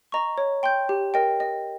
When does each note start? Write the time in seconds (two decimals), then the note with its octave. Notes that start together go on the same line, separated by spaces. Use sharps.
0.12 D#5 A#5 C#6
0.38 C#5
0.63 G5 C6 G6
0.89 G4
1.14 A#4 D#5 G5
1.40 D#5